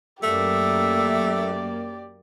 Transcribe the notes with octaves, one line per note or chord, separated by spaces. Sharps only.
F#2 A3 A#3 G4 D5 E5